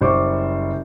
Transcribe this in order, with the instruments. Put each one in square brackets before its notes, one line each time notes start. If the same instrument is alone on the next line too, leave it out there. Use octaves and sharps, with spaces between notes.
[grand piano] F#1 G3 C5 C#6 D6